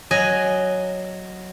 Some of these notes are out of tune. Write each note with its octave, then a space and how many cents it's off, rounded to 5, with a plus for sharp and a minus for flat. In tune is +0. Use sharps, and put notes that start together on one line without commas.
F#3 +0 D#5 +0 G#5 +5